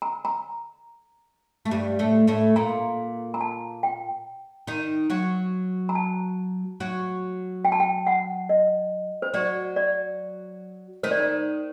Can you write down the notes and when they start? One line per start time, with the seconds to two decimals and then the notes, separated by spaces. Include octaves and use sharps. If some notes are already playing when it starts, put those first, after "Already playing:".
0.02 A#5
0.25 A#5
1.65 A3
1.71 G2 G3
1.99 A2 A3
2.27 A2 A3
2.56 A#2 A#3 A#5
3.34 A#5
3.41 A5
3.83 G5
4.67 D#3 D#4
5.10 F#3 F#4
5.89 A#5
5.95 A5
6.80 F#3 F#4
7.65 G5
7.72 A5
7.80 G5
8.07 F#5
8.49 D#5
9.22 C5
9.34 F#3 F#4 D5
9.76 D5
11.03 D#3 D#4 C5
11.11 D5
11.20 C5